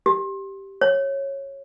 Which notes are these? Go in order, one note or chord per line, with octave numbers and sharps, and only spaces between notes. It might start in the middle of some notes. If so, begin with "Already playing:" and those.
G4
C#5